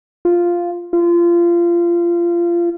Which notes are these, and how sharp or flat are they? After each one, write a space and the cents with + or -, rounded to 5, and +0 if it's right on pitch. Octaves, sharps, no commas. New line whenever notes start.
F4 -5
F4 -25